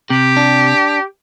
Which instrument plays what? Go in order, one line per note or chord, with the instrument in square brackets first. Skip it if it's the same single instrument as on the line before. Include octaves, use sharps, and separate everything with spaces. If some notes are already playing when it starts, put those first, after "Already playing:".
[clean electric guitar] C3 [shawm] G4
[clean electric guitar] D4